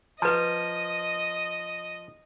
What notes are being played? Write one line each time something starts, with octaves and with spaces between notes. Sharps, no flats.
F3 B4 D#5 A#5